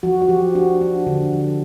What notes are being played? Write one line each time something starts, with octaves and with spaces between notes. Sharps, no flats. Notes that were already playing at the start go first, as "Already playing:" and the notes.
F3 F#4
F#4
F3 G4
D4 F#4
D4
D3
F3